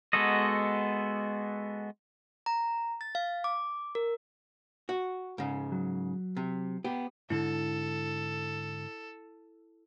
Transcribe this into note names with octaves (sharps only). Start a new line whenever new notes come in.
G#3 B3 F#4 A4 D#5
A#5
A6
F5
D6
A#4
F#4
G#2 C#3
F#3
C3
B3 G4
G#2 D3 E4 A4